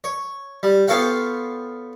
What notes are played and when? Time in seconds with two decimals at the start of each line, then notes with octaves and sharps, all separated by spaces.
0.04 C#5
0.63 G3
0.88 B3 F4 A4 C#5 F5 G5